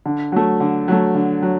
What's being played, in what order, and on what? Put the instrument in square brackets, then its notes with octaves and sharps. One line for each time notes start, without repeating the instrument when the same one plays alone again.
[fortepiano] D3
F#3 A3
D3
F#3 A3
D3
F#3